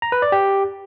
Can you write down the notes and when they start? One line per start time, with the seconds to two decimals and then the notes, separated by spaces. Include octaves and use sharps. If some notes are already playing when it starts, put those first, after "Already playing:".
0.02 A#5
0.12 B4
0.22 D5
0.32 G4